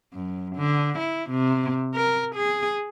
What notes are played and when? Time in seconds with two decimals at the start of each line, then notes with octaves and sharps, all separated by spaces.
0.14 F#2
0.56 D3
0.99 E4
1.30 C3
1.94 A#4
2.36 G#4